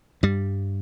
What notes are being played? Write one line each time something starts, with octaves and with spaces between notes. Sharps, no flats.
G2 G3